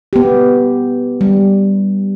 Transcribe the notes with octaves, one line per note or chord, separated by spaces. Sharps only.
B3 G4
G3